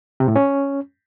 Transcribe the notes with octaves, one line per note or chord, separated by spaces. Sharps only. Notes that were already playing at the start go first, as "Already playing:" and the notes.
C3
A2
C#4